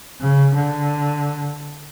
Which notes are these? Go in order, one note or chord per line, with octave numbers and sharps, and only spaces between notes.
C#3
D3